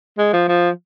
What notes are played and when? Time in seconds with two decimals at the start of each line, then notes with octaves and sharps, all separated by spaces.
0.18 G#3
0.33 F3
0.49 F3